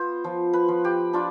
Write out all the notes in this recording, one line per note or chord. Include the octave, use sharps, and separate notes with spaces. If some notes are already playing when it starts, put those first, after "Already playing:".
Already playing: B3 F4 C5
F3
B4
F3
G4
D4 F4